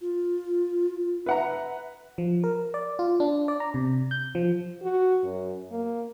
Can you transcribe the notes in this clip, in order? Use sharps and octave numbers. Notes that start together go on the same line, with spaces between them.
F4
B4 E5 F#5 A#5
F3
A#4
D5
F4
D4
D5
A#5
C3
G6
F3
F#4
F#2
A#3